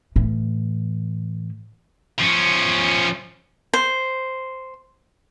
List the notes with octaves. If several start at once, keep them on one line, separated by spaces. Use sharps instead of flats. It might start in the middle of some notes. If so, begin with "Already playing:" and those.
A2 E3
F3 C#4
C5